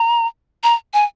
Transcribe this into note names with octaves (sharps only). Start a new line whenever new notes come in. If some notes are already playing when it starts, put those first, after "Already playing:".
Already playing: A#5
A#5
G#5